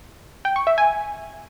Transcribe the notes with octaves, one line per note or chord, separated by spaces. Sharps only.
G5
C#6
E5
G#5